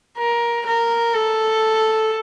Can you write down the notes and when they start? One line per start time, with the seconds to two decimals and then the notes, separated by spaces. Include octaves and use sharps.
0.19 A#4
0.66 A#4
1.14 A4